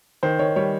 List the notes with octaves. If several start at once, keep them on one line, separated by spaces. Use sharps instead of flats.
D#3 C5
D#3 C#5
G3 C#5